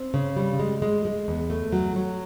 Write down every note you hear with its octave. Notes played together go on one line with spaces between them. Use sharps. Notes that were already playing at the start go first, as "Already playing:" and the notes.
Already playing: C4
C#3
G3
G#3
G#3
G#3
E2
A3
F#3
F#3